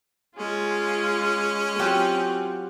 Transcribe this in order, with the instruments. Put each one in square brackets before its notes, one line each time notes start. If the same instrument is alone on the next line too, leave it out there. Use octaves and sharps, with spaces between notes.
[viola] G#3 F4 [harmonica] C#4
[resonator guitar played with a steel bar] F#3 F4 G4 [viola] C4